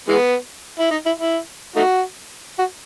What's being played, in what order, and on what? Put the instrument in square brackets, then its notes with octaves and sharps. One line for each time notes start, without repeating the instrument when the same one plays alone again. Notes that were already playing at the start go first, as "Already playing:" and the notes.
[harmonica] E3 G#3 B3
E4
D#4
E4
E4
A3 D#4 F#4
F#4